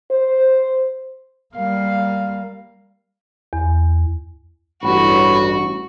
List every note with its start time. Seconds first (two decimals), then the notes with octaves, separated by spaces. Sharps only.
0.11 C5
1.55 G3 A#3 F5
3.53 E2
4.84 A1 G2 F#4 B5